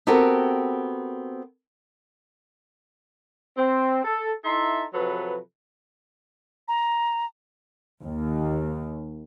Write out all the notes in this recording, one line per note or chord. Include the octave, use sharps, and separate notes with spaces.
B3 C4 F#4 G4 A4 A#4
C4
A4
D#4 E4 A4 E5 A#5 C6
C3 F3 F#3 A4 B4
A#5
D#2